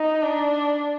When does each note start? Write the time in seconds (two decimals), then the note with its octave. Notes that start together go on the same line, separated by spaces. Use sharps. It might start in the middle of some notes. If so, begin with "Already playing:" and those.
Already playing: D#4
0.23 D4